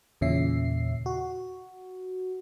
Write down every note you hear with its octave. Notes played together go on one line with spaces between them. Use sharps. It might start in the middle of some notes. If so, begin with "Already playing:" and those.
E2 A#2 C#3 C#4 E5 C7
F#4